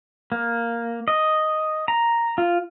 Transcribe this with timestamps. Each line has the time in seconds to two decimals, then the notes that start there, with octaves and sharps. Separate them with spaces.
0.32 A#3
1.08 D#5
1.88 A#5
2.38 F4